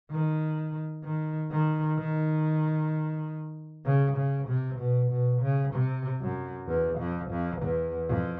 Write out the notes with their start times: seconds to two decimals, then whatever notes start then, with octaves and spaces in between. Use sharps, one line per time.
0.11 D#3
1.03 D#3
1.51 D#3
1.98 D#3
3.86 C#3
4.17 C#3
4.48 C3
4.79 B2
5.11 B2
5.42 C#3
5.74 C3
6.21 F#2
6.67 E2
6.99 F2
7.31 F2
7.62 E2
8.08 F2